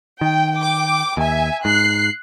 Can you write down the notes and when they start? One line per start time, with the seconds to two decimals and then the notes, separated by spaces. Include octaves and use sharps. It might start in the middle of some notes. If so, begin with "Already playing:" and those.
0.21 D#3 G5
0.55 G5 D6
1.17 D#2 E5 G#5
1.65 G#2 F#6 C7